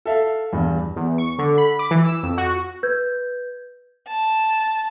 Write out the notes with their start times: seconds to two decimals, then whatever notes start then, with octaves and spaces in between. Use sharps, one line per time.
0.06 A4 E5 F5
0.52 E2 G2
0.96 E2
1.18 C#6
1.39 D3
1.58 B5
1.79 D6
1.91 E3
2.05 E6
2.23 F2
2.38 F#4
2.83 B4 G6 G#6
4.08 A5